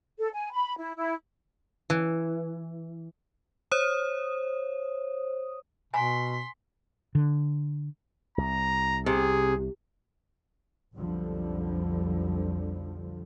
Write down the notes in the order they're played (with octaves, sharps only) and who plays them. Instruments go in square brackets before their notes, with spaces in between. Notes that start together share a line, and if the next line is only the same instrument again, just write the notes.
[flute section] A4
G#5
B5
E4
E4
[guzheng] E3
[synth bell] C5 C#5 D#6
[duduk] B2 [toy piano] G#5 A#5 [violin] C6 B6
[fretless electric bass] D3
[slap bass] C2 [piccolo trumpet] A#5
[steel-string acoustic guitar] C3 [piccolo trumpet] G#4
[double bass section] B1 F2 D3 F3 G3